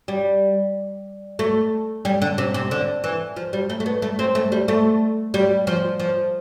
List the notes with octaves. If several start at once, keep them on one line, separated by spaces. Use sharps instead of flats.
G3
A3
G3
D3
C3
C3
D3
E3
F3
G3
A3
A3
B3
A3
C4
A3
G3
A3
G3
F3
F3